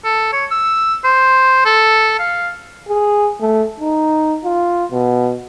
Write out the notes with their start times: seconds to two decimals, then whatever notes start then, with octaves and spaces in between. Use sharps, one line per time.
0.04 A4
0.32 C#5
0.51 E6
1.04 C5
1.65 A4
2.19 F5
2.88 G#4
3.41 A3
3.80 D#4
4.44 F4
4.91 B2